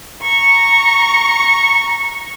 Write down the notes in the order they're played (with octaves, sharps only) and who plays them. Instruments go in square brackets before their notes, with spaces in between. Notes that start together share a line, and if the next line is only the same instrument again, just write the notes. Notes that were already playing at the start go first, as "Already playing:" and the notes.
[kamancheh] A#5 C#6